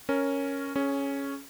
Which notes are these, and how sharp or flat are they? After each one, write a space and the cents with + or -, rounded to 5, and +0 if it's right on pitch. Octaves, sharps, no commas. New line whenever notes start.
C#4 +0 A#4 +0
C#4 +0 G#4 +30